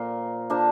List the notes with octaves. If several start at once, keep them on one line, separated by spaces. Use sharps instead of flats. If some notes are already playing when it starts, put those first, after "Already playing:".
Already playing: A#2 F3 A#3 F4 C5
A#3 D4 F4 C5